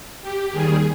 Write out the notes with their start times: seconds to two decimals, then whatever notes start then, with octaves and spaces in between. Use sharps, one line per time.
0.22 G4
0.51 D#2 D#3 G3 G#4